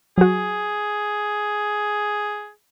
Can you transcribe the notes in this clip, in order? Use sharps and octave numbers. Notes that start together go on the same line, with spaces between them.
F#3 F#4 G#4